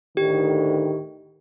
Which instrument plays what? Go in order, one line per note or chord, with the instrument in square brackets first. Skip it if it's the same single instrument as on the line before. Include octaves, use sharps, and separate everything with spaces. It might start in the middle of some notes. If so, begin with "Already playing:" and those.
[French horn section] D2 A2 D#3 [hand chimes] G4